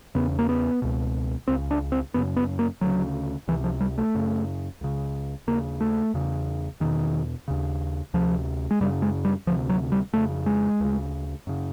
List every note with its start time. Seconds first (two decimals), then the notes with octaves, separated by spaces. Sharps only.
0.15 E2 C#3 B3
0.39 A#3
0.49 B3
0.82 C#2 B2
1.48 C#2 C#3 C4
1.71 D4
1.92 C4
2.14 F#2 C#3 B3
2.36 B3
2.59 A#3
2.81 D2 C#3 F#3
3.48 C#2 E3
3.52 C3
3.64 F3
3.81 G3
3.98 A3
4.15 F#2 C#3
4.81 C#2 C#3
5.47 D#2 C#3 A#3
5.81 A3
6.14 E2 C#3
6.80 E2 B2 D#3
7.48 D#2 C#3
8.14 D2 C3 F3
8.71 G#3
8.81 F#2 C#3 G3
9.02 G#3
9.25 G3
9.47 D2 F3
9.51 C3
9.70 F#3
9.92 G3
10.13 F2 C#3 A3
10.46 G#3
10.80 D2 C#3
11.47 F#2 C#3